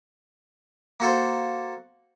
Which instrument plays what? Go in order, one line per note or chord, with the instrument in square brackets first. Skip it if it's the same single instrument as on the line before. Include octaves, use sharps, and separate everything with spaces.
[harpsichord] A#3 F#4 A4 C5